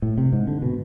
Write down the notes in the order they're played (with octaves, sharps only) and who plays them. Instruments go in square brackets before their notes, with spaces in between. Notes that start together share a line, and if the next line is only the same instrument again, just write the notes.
[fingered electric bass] A2
C3
G#2
D3
B2